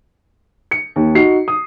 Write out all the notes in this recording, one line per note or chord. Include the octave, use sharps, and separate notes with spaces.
C#7
D#2
D#4 F#4 C7
D#6